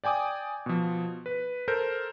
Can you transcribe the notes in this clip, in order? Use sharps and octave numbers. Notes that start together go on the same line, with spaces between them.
D5 G5 G#5 D6 D#6
B2 F3
B4
A4 A#4 C5 G6